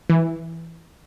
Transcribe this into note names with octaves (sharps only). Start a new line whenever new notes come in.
E3